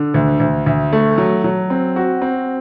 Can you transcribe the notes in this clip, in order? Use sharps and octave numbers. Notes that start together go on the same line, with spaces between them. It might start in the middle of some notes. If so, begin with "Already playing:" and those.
Already playing: D3
D2
D2
D2
A3
F#3
F#3
C4
F#4
C4